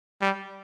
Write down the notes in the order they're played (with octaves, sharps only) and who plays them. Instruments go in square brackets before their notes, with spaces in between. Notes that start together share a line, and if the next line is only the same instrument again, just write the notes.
[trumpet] G3